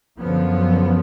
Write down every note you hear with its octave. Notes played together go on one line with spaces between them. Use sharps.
F#2 D3 F3 B3